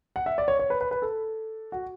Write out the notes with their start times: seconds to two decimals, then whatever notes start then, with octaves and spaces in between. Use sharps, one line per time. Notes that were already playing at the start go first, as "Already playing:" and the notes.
0.16 F#5
0.26 E5
0.38 D5
0.48 C#5
0.59 C#5
0.70 B4
0.81 B4
0.91 B4
1.02 A4
1.72 F#4